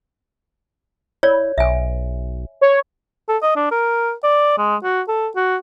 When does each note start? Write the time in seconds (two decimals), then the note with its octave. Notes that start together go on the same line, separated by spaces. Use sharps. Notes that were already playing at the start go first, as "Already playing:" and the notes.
1.23 E4 C#5 D5
1.58 B1 E5 G#5
2.61 C#5
3.28 A4
3.43 D#5
3.56 D4
3.71 A#4
4.24 D5
4.58 G#3
4.83 F#4
5.08 A4
5.36 F#4